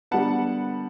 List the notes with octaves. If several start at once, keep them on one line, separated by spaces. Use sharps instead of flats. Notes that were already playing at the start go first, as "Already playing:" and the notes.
D3 G3 B3 F#5 A5